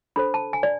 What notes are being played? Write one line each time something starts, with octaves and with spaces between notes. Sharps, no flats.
D4 A4 C5 B5
A5
G#5
D5